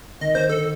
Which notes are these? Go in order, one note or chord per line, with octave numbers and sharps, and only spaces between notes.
D#3 D#5
D#3 C5
D3 A4